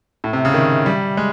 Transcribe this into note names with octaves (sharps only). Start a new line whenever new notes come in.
A2
C3
C#3
D#3
G3
G#3